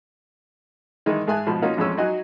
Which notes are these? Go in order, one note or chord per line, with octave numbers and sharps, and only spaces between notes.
D#3 E3 G#3 D#4
G#2 G#4 E5 G#5 A5 F#6
G#2 B2 F3
A#3 C#4 D#4 F4 F#4 A#4
A1 F2 G#3 C#4 E6
F#3 D#4 F#4 D#5 G#5 F#6